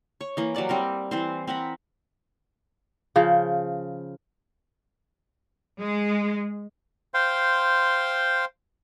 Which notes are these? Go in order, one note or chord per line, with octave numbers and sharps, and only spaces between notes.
C#5
E3 A#3
F#3 G3 D5 F#5
G3 C4 A#4
E3 C4 C5
C4 A#4 F#5 B5
C#3 F3
G#3
C5 F5 G5 C6